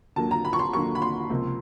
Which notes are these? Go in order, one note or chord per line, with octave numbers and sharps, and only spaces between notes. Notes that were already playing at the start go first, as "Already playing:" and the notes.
D#2 D3 F#3 A#3 A5
A#5
B5
C#6
C6
D#2 D3 F#3 A#3 C#6
B5
C6
C#2 C3 F3 A#3